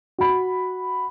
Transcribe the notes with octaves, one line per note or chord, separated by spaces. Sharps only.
F#4 B5